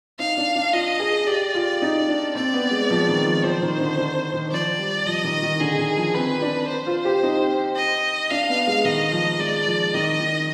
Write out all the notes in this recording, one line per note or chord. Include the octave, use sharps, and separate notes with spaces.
D#4 F5
D4
D4
F4 D#5
G#4
G4 D5
F4
D#4
D4
C4 D5
B3
G#3
F3
D#3
F3
F3 C5
D#3
D3
D3
D#3
F3 D5
G3
F3 D#5
D#3
D#3
D3 G#4
D#3
F3
C4 B4
D4
C5
F4
G4
D#4
D#5
D4 F5
B3
G#3
D#3 D#5
F3
G#3 D5
F3
D#3 D#5
D#3